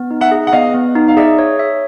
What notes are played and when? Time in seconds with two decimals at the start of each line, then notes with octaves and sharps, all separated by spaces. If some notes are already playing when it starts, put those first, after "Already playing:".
Already playing: B3
0.11 D#4
0.21 E5 F#5
0.31 G#4
0.47 F#5
0.52 B3 D#5 F5
0.74 B3
0.95 D#4
1.08 F5
1.17 G#4 D5 E5
1.39 C#5
1.59 E5